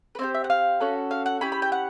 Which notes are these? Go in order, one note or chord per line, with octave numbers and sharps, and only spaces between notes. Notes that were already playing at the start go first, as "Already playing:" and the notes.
B4
C4 E4 G4 C5
E5
F#5
F5
C#4 F#4 A4
F5
F#5
C#4 E4 G4 B5
B5
G5
F#5